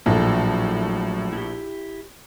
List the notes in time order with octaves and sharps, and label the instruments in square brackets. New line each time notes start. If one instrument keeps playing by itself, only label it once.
[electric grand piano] A#1 [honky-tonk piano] A2 A4 [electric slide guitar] F#3
[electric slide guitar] E4 G4